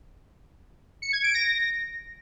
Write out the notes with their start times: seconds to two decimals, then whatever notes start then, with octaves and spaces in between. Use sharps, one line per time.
1.02 C#7
1.13 G#6
1.24 D7
1.34 A#6